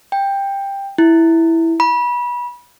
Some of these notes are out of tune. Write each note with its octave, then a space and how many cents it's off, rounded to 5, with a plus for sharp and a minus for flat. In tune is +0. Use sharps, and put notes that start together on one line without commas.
G5 +10
E4 -5
B5 -30